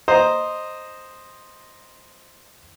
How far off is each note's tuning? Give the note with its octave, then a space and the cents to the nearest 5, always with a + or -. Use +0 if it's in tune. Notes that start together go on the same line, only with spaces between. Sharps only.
C5 +0 D#5 -5 A#5 +0